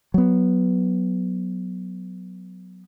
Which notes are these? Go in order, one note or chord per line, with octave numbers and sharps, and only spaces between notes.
F#3 B3